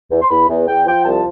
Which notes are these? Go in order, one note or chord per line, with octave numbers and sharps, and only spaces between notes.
E2
C6
E2 B5
E2
E2 G5
F3 G5
C2 A5